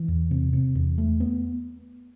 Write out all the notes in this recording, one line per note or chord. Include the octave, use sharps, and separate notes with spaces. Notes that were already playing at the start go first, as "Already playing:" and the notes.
Already playing: E3
E2
C3
C3
E2
A3
B3